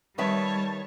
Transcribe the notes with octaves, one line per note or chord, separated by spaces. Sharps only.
D#3 G3 B4 C#5 E5 A5